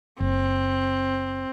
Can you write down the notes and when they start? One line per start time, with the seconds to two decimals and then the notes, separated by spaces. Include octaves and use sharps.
0.20 F#1 C4